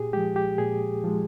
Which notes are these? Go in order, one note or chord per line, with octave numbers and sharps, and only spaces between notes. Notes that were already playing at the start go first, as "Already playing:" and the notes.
Already playing: A#2 G4 G#4
F3 G#3 G4
G4
A#2 G#4
F3 G#3